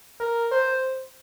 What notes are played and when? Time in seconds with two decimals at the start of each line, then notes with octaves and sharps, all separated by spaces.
0.20 A#4
0.51 C5